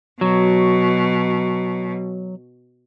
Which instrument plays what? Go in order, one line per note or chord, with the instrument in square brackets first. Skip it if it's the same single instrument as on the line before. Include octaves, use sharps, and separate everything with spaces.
[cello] B2 [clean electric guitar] F#3